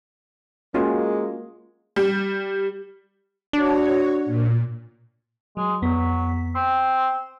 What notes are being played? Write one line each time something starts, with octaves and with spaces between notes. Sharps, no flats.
G#3 A#3 C#4 F4 F#4
G3
D4 F#4 C#5
A#2
F#3 G#3
F2 F#3 B3 B6
C4 C6